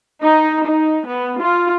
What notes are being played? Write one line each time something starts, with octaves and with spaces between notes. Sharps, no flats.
D#4
D#4
B3
F4